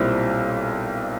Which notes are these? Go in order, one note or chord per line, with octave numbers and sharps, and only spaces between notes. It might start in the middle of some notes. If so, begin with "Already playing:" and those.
Already playing: B1 A#2 G3 C4 E4